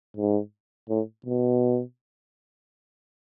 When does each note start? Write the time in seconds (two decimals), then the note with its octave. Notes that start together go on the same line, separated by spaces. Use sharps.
0.17 G#2
0.89 A2
1.26 B2